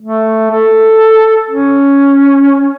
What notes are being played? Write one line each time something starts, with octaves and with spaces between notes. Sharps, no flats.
A3
A4
C#4